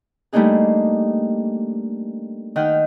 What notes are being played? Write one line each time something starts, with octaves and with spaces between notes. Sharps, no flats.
G3 A3 A#3 D4 D#4 G#4
D#3 F#5 G5 F6